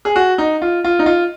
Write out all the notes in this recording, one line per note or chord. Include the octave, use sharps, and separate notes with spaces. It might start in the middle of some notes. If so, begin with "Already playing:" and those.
G#4
F#4
D#4
F4
F4
D#4
F4